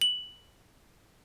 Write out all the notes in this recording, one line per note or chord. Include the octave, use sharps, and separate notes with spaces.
F#7